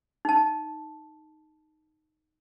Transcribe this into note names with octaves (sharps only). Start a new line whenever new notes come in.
D#4 A5